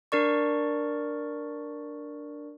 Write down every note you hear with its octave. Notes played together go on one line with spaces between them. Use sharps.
D4 A#4 D5 C#6